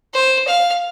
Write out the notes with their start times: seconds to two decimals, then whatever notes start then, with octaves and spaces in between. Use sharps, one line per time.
0.14 C5
0.48 F5